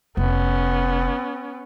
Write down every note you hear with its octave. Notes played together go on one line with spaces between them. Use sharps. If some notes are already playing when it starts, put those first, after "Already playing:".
F1 B3 C#4